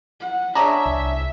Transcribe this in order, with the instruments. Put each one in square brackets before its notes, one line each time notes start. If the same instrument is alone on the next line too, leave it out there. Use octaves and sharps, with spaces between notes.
[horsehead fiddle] F#5
[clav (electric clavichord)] D4 G#4 C#5 [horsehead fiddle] E5 [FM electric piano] A#5
[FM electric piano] C2